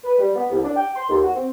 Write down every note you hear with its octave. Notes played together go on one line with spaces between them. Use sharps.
B4
G3
B3
C2
D4
G5
C6
D#2
F#4
C4